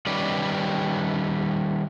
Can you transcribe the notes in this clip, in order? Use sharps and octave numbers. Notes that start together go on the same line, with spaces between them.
D#3 G3 C#4 B4 D5